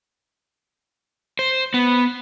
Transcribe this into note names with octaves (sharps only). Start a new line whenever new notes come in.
C5
B3